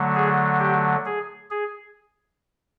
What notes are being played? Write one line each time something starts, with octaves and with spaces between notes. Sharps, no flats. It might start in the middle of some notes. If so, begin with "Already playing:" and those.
Already playing: D3 F#3 A3
G#4
G4
G#4
G#4